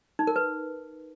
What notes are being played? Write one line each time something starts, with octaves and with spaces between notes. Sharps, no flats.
D#4
A#4
B4